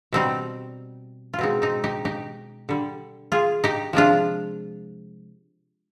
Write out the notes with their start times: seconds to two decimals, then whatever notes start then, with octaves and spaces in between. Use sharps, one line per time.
0.13 B2 G3 C4 D#4
1.34 F4
1.39 B2 G#3 C4 D#4
1.62 C4 D#4
1.84 D#4 G4
2.05 D#4 G4
2.69 D3 G3
3.32 F4 G#4
3.64 D#4 G4
3.93 C3 F3 G#3 D4 F4